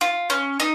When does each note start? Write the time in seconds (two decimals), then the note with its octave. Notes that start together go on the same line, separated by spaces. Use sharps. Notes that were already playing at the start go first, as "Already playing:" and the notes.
0.01 F4
0.30 C#4
0.60 D#4